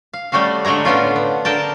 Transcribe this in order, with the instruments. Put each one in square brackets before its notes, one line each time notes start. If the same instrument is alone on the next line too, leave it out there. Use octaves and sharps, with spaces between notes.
[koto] F5
G3 A3 C#4 F#4 F5
D3 G#3 A3 C#5 A#5
A2 D3 B3 C#4 F4
B3
D3 A#4 G5 A5